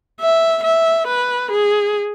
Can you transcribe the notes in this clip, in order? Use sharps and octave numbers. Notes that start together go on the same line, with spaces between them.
E5
E5
B4
G#4